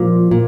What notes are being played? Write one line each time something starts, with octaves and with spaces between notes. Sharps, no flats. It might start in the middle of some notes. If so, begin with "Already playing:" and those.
Already playing: A#2 F3
A#2